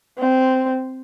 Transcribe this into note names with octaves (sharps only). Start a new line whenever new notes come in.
C4